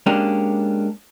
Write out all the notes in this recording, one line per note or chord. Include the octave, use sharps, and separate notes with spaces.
G#3 A#3 C#4 D4 G4